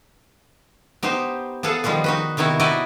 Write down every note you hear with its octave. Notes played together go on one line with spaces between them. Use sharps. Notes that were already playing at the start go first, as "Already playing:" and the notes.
B3 D#4 G4 C5
B3 G#4 A4 F5 F#5
D#3 F3 G3 G#3 B3
D#4 F#4 B4
C3 D#3 B3 E4 F#4
D#4 E4 F#4 B4 D5 D#5